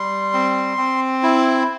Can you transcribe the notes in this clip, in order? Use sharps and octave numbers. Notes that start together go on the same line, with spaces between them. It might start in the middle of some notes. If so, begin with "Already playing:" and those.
Already playing: G3 C6
C4
C4
E4